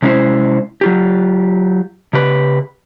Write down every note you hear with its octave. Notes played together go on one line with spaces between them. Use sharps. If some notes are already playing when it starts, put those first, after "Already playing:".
C3 G#3 C#4 E4 C5
F#3 F4 G4
C#3 G4 B4